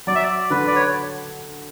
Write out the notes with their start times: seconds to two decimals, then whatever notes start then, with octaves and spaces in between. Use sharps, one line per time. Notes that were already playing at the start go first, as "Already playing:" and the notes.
0.07 F#3 D5
0.15 E5
0.23 D5
0.50 D3 B4
0.67 D5
0.76 C#5